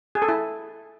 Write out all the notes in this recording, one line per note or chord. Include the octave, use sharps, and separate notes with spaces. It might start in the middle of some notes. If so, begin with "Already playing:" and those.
G#4
A4
E4